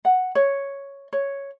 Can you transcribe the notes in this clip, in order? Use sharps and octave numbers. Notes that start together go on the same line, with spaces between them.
F#5
C#5
C#5